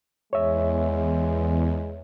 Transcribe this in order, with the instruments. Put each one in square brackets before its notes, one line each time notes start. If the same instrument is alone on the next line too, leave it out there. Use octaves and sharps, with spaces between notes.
[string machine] E2 [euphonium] G#3 [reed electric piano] C#5 E5